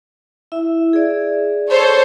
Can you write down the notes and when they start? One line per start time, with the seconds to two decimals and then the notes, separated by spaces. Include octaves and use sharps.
0.52 E4 E5
0.93 G#4 D5
1.70 A4 C5 C#5